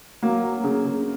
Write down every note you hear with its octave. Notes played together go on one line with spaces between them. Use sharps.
F#3 A#3
F#3
C#3
C#3